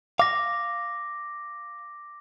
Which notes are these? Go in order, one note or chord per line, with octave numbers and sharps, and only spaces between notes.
F5 D6 A#6